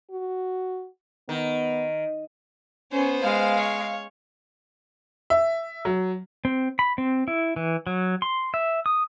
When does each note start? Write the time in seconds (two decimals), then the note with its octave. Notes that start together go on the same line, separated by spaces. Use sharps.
0.11 F#4
1.29 D#3 B3
2.92 B3 C#4 C5
3.23 G#3 F5
3.58 C#5
5.30 E5
5.85 F#3
6.45 C4
6.79 B5
6.98 C4
7.28 E4
7.56 E3
7.87 F#3
8.22 C6
8.54 E5
8.86 D#6